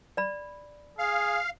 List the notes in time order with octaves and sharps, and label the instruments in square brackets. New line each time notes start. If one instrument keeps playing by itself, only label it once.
[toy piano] D5 B5
[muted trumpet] G#4 [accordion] F5